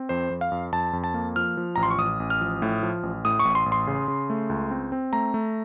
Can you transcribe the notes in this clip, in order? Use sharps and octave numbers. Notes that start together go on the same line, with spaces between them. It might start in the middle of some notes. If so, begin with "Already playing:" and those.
Already playing: C4
F2 C5
F2
F5
F2
F2 A5
F2
A5
A#3
F3 F6
F3
A1 A#5
C6
C#6
A1 D#6
A1
F6
F3
A2
F3
A1
A2 D#6
C#6
A1
C6
A1
C6
C#3
C#3
A3
C#2
C4
C4
A3 A#5
A3